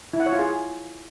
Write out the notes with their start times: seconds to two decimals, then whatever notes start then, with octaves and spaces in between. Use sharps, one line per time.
0.14 E4
0.20 F#5
0.26 C#5
0.33 F4
0.39 G#4